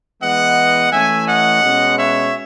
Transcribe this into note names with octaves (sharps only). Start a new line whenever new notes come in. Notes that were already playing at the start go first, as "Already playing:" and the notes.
E3 G#3 B3 D#5 F#5
E3 A3 C#4 E5 G#5
D#5 F#5
B2 G#3 C#4
C#5 E5